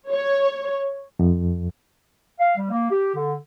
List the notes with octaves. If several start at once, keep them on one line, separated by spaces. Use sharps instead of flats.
C#5
F2
F5
G3
A#3
G4
D3